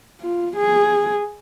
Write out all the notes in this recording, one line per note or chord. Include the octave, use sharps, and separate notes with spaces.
F4
G#4